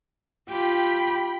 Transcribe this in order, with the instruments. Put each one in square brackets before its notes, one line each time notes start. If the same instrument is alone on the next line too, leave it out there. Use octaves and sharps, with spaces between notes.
[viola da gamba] F4 G4 [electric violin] G5 B5